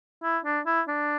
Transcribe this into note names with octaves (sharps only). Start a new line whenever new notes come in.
E4
D4
E4
D4